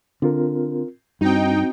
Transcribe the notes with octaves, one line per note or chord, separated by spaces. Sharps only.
D3 C4 F4 A#4
G2 C4 D#4 F#4 G5